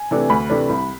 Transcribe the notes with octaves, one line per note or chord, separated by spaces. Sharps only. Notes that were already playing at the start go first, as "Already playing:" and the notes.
Already playing: G#5
C3 E3 A3 D4
D2 B5
C3 E3 A3 D4
C2